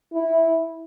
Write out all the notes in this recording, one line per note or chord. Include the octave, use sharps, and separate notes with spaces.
E4